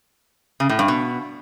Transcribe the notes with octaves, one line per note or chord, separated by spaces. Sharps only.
C#3
A2
G2
B2